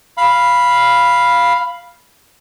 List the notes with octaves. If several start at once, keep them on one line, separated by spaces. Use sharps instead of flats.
F5 B5